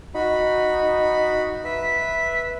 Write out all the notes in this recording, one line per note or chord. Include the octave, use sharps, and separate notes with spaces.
D#4 F#4 B5
B4 E5